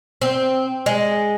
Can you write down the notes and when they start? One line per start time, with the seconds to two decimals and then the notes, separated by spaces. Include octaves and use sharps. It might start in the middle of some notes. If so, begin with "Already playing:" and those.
0.22 C4
0.86 G#3